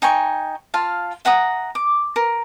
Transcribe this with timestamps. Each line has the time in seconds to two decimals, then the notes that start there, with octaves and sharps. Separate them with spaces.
0.02 D#4 G5 G#5 C#6
0.74 F4 F5 A5
1.25 E5 F#5 A#5 D#6
1.75 D6
2.16 A#4